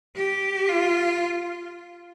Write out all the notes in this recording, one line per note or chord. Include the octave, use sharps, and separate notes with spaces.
G4
F4